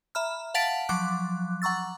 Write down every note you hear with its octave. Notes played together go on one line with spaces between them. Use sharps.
E5 A#5 B5 F6
F5 F#5 A5 A6 B6 D7
F3 F#3 D6 F#6
F#5 A#5 C#6 E6 A6